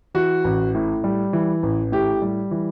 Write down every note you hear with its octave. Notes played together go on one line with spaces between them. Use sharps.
E3 F#4
A1
A2
G3
E3
A1
A2 G4
G3
E3